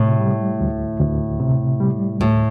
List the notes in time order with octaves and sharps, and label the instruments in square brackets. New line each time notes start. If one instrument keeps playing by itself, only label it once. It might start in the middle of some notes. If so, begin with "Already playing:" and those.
Already playing: [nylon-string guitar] A2 [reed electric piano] C3
[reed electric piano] G3
D2
D2
C3
G3
[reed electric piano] D2 [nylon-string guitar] A2